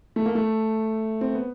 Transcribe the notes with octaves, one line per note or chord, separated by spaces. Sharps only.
A3
A#3
A3
C4
B3